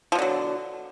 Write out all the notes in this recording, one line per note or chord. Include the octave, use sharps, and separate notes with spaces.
B2 D3 F3 F#3